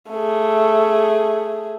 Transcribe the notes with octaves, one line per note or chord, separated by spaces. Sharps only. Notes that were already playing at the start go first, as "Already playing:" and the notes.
A3 G#4